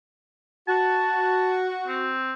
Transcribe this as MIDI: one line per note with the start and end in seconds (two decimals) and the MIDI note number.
0.68 2.13 66
0.68 1.56 81
1.87 2.34 60